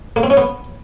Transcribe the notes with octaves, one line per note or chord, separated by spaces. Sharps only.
A#3
C4
C#4
B3